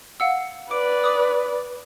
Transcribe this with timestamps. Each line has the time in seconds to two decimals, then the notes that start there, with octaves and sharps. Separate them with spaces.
0.20 F5 F#5 E6
0.71 B4 D5 D6 D7
1.04 D6 D#6